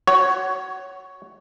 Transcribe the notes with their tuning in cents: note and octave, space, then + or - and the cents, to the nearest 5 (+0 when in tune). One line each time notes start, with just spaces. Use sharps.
F#4 +20 C#5 +5